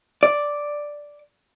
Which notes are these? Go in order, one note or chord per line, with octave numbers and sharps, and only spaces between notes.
D5